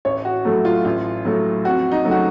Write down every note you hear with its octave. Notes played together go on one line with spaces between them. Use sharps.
A1 C#5
F#4
A2 F#3 A3
F4
A1 F4
A2 F#3 A3
F2 F#4
D#4
C#3 F#3 A3
F#4